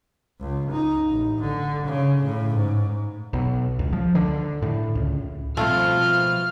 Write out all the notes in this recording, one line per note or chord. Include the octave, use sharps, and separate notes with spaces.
C#2
D#4
A1
D3
C#3
A2
G#2
B1
C#2
F3
D3
A2
C#2
B2 F3 A3 C4 F4 F6